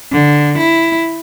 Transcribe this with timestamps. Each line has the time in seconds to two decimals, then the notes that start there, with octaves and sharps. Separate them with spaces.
0.12 D3
0.58 E4